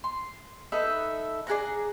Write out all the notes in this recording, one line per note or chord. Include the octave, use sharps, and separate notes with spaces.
C6
D#4 A4 B4 E5
D4 G#4 F#5 A#5